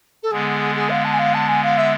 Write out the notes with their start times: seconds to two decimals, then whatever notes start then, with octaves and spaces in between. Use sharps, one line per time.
0.22 A4
0.31 D3 G#3 B3 G#4
0.75 G#4
0.89 F5
1.04 A5
1.12 G#5
1.18 F5
1.33 A5
1.47 G#5
1.63 F5
1.77 E5